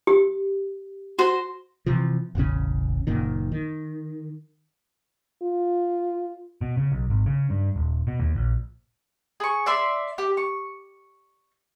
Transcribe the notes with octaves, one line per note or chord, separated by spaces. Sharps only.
G4
F#4 C5
C3 E3 F3
E1 A1 C#3 C#4
F#1 A#2 D#3
D#3
F4
B2
C#3
B1
G#1
C#3
G2
D#1
B2
D#2
A#1
G#4 C#6
D5 E5 C6
G4
C#6